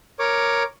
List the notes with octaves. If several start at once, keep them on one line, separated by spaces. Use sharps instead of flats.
A#4 C#5 D6